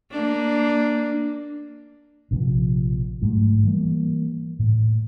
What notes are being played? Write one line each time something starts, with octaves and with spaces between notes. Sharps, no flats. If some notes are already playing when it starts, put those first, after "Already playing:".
A#3 D4
A#1 C3 F3
G#2 F#3 A3
E3 G3 A#3
A2